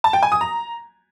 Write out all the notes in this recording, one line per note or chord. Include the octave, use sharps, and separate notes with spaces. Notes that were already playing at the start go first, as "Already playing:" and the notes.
A5
G5
G#5
D#6
A#5